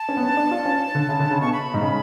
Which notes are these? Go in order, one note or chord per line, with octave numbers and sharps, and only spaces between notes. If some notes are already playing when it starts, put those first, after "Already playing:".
Already playing: A5
C#4
B3
C#4
D4
F4
C#4
D3
C#3
D3
C#3
B2 C#6
B5
G#2
C#3